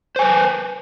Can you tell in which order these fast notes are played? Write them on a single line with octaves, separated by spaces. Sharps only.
C5 G#5 B4